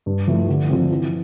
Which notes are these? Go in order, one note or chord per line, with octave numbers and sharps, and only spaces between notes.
G2
F3 A3 E4
D3
F3 C4
E3